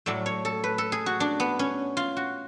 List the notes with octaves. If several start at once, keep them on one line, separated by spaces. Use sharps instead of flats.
A2 F#3 A3 D5
C#5
A4
B4
A4
G#4
F#4
D4
B3
C#4
F4
F#4